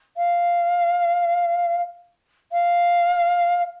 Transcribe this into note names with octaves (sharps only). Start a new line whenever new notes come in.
F5
F5